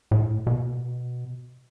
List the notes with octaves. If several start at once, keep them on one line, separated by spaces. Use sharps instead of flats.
A2
B2